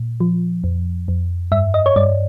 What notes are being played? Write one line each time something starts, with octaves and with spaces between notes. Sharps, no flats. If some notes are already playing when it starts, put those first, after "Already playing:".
Already playing: A#2
F3
F2
F2
G2 E5
D#5
C#5
G2 D5